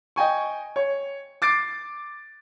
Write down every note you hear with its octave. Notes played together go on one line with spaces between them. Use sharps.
D#5 G5 G#5 C#6
C#5
D6 A6 C7 D7